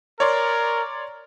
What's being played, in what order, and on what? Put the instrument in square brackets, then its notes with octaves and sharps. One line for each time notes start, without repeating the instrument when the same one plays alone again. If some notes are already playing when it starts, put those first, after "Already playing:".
[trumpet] A#4 [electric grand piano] C#5 D5 C6